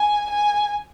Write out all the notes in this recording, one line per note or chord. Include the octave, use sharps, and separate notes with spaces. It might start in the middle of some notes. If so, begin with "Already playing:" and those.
Already playing: G#5
G#5